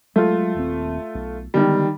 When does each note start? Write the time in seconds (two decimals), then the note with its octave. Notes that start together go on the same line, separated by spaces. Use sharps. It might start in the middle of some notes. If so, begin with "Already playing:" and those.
0.16 F#3 G#3 A3 F4
0.54 D#1 D#2 C4
1.15 B1
1.54 D3 D#3 G3 G#3 B3